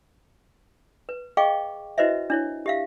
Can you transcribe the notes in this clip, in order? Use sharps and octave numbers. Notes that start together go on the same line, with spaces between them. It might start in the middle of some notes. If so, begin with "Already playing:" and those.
B4
G#4 D#5 F5 G5 C#6 D6
E4 F#4 B4 C5 D#5 E5
D4 E4 C#5
G4 E5 F5